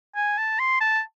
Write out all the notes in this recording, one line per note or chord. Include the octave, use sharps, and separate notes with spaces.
G#5
A5
C6
A5